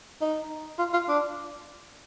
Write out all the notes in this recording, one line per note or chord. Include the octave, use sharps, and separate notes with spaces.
D#4
F4
F4
D4